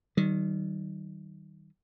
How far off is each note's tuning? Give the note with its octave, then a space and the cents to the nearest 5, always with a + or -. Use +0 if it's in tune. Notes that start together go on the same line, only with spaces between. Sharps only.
D#3 +0 G3 -40